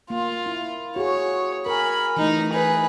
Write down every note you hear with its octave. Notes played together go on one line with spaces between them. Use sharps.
A#3 F4
E4
F#4 G#4 C#5
A#4 G#5 B5
E3 A3 D#4 D#5
G#4 B4